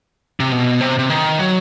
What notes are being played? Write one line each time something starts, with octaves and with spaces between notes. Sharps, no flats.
C3
B2
C3
C3
D#3
F#3